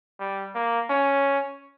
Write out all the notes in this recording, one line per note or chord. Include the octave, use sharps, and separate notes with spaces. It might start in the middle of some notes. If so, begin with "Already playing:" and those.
G3
A#3
C#4